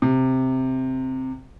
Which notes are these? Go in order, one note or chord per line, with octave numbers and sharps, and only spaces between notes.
C3